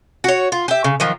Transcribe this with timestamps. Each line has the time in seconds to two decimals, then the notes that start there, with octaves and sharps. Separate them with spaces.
0.24 F#4 C#5
0.52 F4
0.68 G4 E5
0.84 C#3
1.00 D#3 F3 F#3